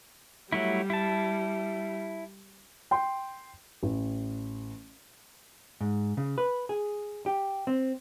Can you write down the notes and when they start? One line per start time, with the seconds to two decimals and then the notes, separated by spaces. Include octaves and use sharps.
0.52 F#3 G3 A3 E4
0.90 E4 A5
2.91 G5 C6
3.83 A1
5.81 G#2
6.17 C#3
6.38 B4
6.69 G#4
7.26 G4
7.67 C4